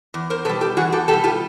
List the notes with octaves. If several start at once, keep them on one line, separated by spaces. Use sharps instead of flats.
E2
A#4 C5
B2 G3 A4 B4
G4 A4
E2 F#4 G#4
G4 A4
B2 G4 A4
G3
F4 G4